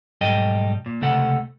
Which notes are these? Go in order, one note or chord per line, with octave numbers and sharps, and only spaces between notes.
B1 G#2 G3 A4 D#5 G5
A#2
C#2 C3 A3 A4 F#5